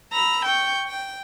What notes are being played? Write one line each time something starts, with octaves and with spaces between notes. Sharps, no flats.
A#5 B5 E6
G5 C#6
G5